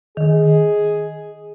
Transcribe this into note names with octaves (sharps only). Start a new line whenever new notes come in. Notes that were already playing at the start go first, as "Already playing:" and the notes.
D#3 G#4